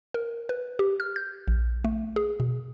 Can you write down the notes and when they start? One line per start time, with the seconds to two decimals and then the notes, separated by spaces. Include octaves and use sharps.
0.14 A#4
0.49 B4
0.79 G4
1.00 F6
1.16 G6
1.48 A#1
1.84 A3
2.16 G#4
2.40 B2